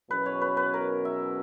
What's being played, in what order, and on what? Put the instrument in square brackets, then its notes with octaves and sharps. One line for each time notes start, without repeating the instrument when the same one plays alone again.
[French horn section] E2 B2 F#3 C#4 [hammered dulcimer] B4
[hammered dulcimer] C#5
B4
B4
A#4
E5